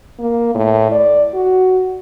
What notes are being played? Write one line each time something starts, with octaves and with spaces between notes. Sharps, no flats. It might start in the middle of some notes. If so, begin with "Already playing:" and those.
A#3
A2
D5
F#4